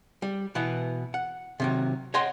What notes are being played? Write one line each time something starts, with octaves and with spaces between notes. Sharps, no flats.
G3
B2 E3 B3
F#5
C3 D#3 F#3
C#5 D#5 F#5 G5 C6